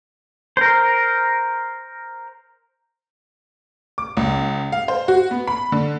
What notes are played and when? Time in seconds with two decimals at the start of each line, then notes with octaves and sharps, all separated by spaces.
0.57 A#4 C5
3.98 D6
4.17 C#2
4.72 F5
4.88 C5
5.08 F#4
5.31 B3
5.47 B5
5.72 D3